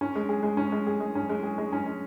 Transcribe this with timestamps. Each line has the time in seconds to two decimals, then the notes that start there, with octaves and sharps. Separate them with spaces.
0.01 C#4
0.15 G#3
0.29 G#4
0.43 G#3
0.57 C#4
0.72 G#3
0.87 G#4
1.00 G#3
1.15 C#4
1.29 G#3
1.43 G#4
1.58 G#3
1.73 C#4
1.86 G#3